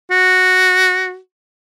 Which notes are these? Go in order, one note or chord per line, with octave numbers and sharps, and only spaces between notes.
F#4